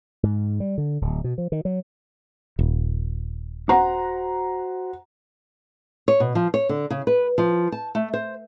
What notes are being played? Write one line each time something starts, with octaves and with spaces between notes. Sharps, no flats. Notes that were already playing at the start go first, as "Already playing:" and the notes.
G#2
G3
D3
D1
B2
F3
D#3
F#3
D#1
F#4 C5 F#5 A#5
C#5
B2
F3
C#5
D3
C#3
B4
F3
A5
A3
C5